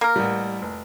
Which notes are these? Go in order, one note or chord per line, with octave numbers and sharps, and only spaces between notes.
A#3 A#4
A1 G3
F1